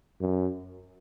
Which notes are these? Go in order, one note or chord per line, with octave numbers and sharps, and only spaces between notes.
F#2